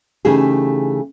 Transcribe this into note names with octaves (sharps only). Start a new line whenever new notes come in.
C#3 E3 A3 D#4 G4 G#4